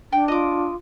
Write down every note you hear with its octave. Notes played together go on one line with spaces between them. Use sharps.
D4 G5
F4 D#5 D6